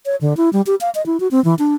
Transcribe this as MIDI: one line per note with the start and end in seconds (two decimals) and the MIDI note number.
0.06 0.16 73
0.21 0.36 50
0.37 0.50 64
0.53 0.62 55
0.67 0.75 67
0.81 0.90 77
0.95 1.04 75
1.06 1.20 64
1.20 1.28 66
1.31 1.43 60
1.45 1.55 52
1.59 1.75 62